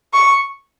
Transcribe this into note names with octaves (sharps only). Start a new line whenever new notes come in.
C#6